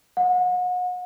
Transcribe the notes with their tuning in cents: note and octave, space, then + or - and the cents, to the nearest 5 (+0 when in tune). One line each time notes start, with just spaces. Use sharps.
F#5 -35